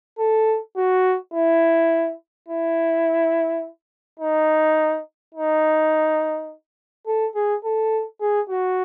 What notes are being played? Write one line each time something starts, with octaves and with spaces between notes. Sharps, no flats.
A4
F#4
E4
E4
D#4
D#4
A4
G#4
A4
G#4
F#4